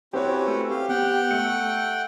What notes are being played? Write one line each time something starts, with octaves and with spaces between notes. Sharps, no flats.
C4 C#4 E4 F#4 G4 B4 C#5
A3
G4 F5
B3 F#5 G5
A3 C#7